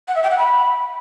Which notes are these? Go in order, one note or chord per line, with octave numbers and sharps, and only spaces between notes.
F#5
E5
G5
F#5
B5